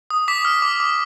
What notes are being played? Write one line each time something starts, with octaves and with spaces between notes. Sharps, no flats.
D#6
D6 B6
F6
D6
D6